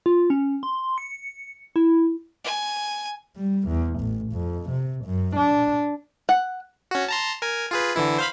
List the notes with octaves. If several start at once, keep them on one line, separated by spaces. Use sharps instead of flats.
F4
C#4
C6
C#7
E4
G#5
G3
E2
A1
F2
C3
F#2
D4
F#5
C#4 F#4
A5 A#5 C6
A#4 G#5
F4 G#4 B4
D3 E3 E4
C5 F5 B5